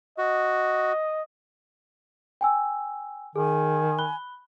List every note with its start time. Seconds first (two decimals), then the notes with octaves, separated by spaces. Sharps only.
0.18 F#4 D#5
2.41 G5 G#5 E6
3.36 D#3 G#4 G#5
3.99 B5 F#6 G7